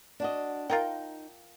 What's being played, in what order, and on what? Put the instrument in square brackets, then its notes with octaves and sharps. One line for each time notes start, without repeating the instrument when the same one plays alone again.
[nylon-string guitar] D4 F#4 D#5
[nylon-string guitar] D#4 [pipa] F4 A#4 G5